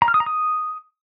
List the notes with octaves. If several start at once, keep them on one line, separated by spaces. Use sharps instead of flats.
A#5
F6
D#6
A#5
D#6